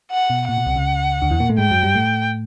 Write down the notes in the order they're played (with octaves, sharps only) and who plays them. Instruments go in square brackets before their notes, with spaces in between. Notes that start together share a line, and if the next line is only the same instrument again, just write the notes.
[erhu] F#5
[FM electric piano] B2
[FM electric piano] A#2 [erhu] F#5
[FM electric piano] B2
C2 C3
C#2 C#3
D2 D3
E2 E3
A#2 A#3
A2 A3
[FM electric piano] G#2 G#3 [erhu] G5
[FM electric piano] F#2 F#3
G2 G3
A2 A3